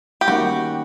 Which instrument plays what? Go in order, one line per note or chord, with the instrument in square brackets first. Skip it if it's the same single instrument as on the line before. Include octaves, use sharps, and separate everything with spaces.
[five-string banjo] G4
[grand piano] D#3 G3 A#3 C#4 [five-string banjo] F#4